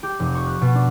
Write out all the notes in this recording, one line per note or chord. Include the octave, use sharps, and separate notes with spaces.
G4
F1
C#6
F#6
B2
D4